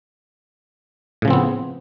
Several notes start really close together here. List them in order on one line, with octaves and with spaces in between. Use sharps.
A2 C#3 F3 C4 B3